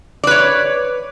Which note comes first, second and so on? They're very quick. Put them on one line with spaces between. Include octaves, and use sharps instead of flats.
D5 B4 C#5